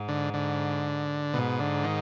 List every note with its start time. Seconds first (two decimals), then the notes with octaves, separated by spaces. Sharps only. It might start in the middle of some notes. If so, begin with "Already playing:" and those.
Already playing: G#2
0.08 D3
0.34 D3
1.33 G#2 B2
1.59 D3
1.84 D#3